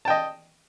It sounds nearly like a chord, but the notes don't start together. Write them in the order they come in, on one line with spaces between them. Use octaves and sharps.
A5 G5 D#5